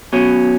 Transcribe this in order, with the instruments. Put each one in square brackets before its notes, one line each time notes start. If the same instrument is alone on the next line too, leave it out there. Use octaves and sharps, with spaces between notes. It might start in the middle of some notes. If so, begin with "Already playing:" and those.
[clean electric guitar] B2 F#3 C#4